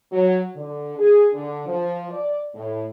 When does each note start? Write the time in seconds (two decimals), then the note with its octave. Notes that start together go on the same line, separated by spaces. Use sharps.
0.12 F#3
0.55 D3
0.98 G#4
1.33 D3
1.66 F3
2.10 D5
2.54 A2